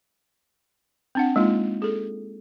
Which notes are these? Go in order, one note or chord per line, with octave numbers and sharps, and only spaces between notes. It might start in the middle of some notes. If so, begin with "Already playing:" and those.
C4 D4 F#5
G#3 A#3 D#4 F4
G#4 A4